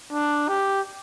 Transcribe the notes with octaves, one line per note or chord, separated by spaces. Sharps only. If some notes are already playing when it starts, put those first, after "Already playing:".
D4
G4